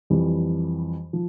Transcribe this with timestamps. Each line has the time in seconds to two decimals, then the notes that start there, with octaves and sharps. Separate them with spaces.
0.10 F2 E3 G3
1.13 F3